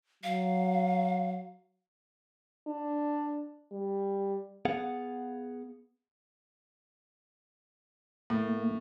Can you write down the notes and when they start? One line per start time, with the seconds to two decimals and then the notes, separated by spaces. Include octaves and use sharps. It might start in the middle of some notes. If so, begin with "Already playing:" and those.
0.23 F#3 F5
2.67 D4
3.72 G3
4.65 B3 G#4 F5 F#5
8.30 A2 A#3